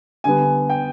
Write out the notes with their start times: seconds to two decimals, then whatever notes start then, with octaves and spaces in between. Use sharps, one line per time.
0.24 D3 G3 B3 G#5
0.70 G5